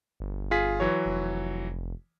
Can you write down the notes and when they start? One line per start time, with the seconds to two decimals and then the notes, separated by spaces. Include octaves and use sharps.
0.20 G1
0.51 F4 G#4 B6
0.80 E3 F#3 C#5
1.06 F1